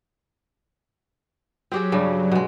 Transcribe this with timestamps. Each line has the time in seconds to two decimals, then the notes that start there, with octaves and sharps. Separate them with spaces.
1.72 F#3 C4 G4 G#4
1.92 G2 C#3 G3
2.32 B2 G#3